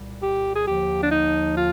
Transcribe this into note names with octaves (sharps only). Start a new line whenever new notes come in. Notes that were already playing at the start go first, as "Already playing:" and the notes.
Already playing: C2 A#2 G3
G4
G#4
D#2 D3 F3 G4
D4
D#4
F4